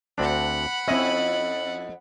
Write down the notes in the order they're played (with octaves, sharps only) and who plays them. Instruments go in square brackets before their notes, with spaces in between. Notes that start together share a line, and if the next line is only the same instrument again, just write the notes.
[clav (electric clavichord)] D2 C4 D4 [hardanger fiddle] F#5 B5
[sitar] F2 D#5 [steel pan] C4 E5 [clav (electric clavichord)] C#4 E4